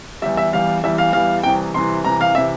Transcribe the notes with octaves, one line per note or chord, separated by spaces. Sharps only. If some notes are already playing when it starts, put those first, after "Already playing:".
E2 E3 G3 E5
E5
E2 E3 G3 F5
E2 E3 G3 E5
F5
E2 E3 G3 F5
C2 C3 E3 G5
C2 C3 E3 C6
C2 C3 E3 A#5
F5
C3 E3 E5